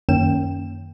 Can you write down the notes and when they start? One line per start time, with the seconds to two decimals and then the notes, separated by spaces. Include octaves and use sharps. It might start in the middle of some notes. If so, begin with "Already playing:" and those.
0.09 F#2 D#3 A#3 C#4 G5 E7